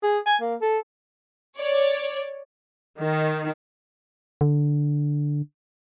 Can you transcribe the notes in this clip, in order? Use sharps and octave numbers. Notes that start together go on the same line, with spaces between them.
G#4
G#5
A#3
A4
C#5 D5
D#3
D3